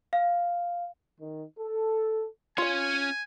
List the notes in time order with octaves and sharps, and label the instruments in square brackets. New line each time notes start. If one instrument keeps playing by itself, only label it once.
[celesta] F5
[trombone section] D#3
A4
[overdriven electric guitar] C#4 C#5 [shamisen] F4 F5 [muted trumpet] G#5